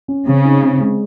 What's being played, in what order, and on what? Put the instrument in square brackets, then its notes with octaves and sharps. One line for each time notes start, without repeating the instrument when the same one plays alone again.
[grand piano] C#4
[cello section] C#3 [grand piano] C4
[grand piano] D#4
C4
G#3